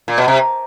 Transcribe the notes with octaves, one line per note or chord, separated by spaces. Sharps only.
A#2
B2
C3